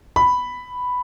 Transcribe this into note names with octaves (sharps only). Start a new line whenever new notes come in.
B5